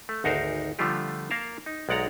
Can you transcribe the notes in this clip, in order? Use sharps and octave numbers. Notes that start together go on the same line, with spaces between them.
A3
G#1 D2 D#4 F#4 A#4 C5
D3 F3 G3 A3 F4 G4
A#3 A#4 F5 A5
D#4
B1 G#3 D5 F#5 A#5